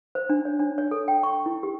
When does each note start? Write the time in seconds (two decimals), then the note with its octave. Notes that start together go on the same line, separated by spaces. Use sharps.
0.15 C5
0.30 D4
0.45 C#5
0.59 D4
0.78 C#5
0.91 A4
1.08 G5
1.23 C#6
1.46 E4
1.63 G4